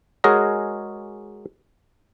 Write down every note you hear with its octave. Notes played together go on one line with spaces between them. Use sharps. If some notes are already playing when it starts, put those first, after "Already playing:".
G#3 F#4 G#4 A#4 C#5 D#5